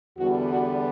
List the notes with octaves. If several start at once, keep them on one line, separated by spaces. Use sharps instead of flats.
E2 D3 G3 B3 F#4
F#4